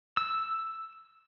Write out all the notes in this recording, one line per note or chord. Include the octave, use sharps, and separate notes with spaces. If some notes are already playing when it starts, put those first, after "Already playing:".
E6